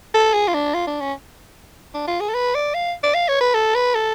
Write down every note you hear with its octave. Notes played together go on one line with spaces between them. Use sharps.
A4
G#4
F4
D4
F4
D4
C#4
D4
F4
G#4
A4
B4
D5
F5
D5
F5
C#5
B4
A4
B4
A4